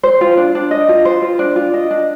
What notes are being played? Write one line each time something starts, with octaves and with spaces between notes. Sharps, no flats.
C5
F4
D4
D4
D#5
F4
C5
F4
D4
F4
D#5
D4